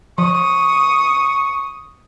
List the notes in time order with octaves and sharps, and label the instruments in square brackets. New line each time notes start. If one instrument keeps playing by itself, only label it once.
[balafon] F3 [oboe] C#6 [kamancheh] D#6